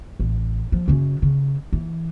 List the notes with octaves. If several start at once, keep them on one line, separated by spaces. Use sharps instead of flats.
A1
F3
F#2 C#3
C#3
E3